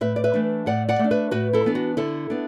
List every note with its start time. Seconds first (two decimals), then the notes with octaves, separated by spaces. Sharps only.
0.01 A2 B4 E5
0.16 D5
0.24 B4 E5
0.34 E3 A3 D4
0.66 A2 D5 F#5
0.89 D5 F#5
0.99 A3
1.04 D4
1.11 B4 E5
1.31 A2 F#4 B4
1.53 E4 A4
1.65 E3 B3 D4
1.75 F#4
1.97 D3 E4 A4
2.30 B3 D4